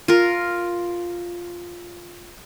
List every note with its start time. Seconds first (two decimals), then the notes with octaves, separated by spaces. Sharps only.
0.08 F4 A#4